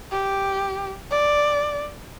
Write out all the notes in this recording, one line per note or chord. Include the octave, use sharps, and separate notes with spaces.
G4
D5